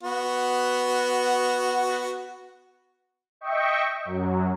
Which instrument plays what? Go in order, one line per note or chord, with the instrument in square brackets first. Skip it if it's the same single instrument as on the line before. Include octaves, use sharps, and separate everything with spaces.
[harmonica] B3 F#4
[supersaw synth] D#5 E5 G5 C#6
F#2 F#3